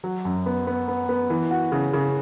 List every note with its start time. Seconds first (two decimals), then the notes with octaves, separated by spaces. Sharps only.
0.04 F#3
0.25 F#2
0.46 B3
0.67 B3
0.88 B3
1.09 B3
1.30 E3
1.51 F#4
1.72 C#3
1.93 C#3